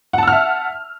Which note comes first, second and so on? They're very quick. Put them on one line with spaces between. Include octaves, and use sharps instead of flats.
F#5 A5 E6 F6 E5